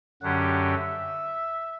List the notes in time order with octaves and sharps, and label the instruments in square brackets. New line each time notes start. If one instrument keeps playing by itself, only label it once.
[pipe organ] F#2 D3 F#3 C#4 G4 [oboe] F#5
[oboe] F#5
E5